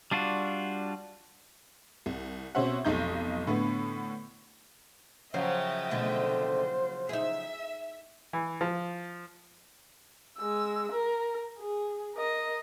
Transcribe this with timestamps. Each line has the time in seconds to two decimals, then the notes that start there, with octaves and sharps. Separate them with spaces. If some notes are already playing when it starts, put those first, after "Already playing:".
0.11 G3 D4 F4 F#4
2.06 C2
2.55 B2 C4 C#4 C5 E5 F#5
2.85 F1 B1 D#4 G6
3.47 A2 D3 B3
5.34 C#3 F3 F#3 C5 D#5 E5 G5
5.91 B2 D3 A3 C5
7.09 D#4 G#4 E5
8.33 E3
8.61 F3
10.38 G#3 E6
10.92 A#4
11.59 G#4
12.15 A#4 D#5